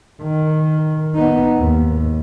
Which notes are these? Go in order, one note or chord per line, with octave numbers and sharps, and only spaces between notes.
D#3
B3 D#4
D#2 G#2